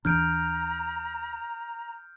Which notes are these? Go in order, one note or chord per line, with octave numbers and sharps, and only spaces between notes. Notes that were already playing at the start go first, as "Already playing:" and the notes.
D#2 E3 D4 A#5 F6 G6 D7